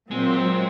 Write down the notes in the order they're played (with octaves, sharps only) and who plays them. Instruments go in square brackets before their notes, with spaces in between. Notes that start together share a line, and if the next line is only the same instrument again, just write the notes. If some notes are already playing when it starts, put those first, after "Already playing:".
[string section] A#2 F#3 C4 [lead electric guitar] G#3